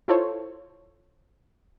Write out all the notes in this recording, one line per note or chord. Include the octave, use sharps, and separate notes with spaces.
E4 F4 A4 C5 C#5